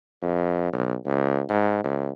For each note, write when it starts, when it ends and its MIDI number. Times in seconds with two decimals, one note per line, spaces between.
0.22 0.68 41
0.73 0.95 35
1.06 1.42 37
1.49 1.82 44
1.84 2.11 37